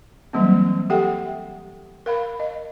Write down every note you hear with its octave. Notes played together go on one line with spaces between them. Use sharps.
E3 F#3 G3 A#3 C4
G4 A4 E5 F#5 G5
A#4 F5 B5
D#5